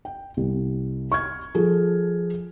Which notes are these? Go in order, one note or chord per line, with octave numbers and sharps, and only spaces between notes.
G5
C2
C#6 F6 G#6
F3 F4 G#4 A4